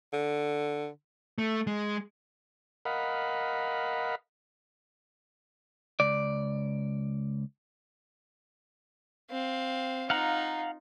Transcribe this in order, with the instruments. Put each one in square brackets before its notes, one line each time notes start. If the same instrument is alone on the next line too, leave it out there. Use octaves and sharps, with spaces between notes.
[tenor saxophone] D3
[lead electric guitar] A3
G#3
[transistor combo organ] A#4 D#5 F5 F#5 B5
[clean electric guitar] C#2 D5
[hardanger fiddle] C4 F5
[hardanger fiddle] D#4 F4 [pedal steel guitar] F5 F#5 A#5